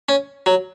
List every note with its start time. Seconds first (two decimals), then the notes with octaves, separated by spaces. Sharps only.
0.09 C#4
0.46 F#3